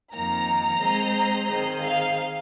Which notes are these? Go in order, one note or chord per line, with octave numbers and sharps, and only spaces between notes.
F2 D#3 A#3 D#4 A#4 A#5
G#3 C4 G#4 C5 D#5
D#3 C4 G#4 C5 D#5
F5